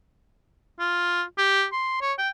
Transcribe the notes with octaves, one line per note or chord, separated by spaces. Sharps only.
F4
G4
C6
C#5
G5